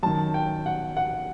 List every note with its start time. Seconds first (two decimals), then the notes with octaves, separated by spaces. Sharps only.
0.03 F#2 D#3 A5
0.34 G5
0.66 F#5
0.97 F#5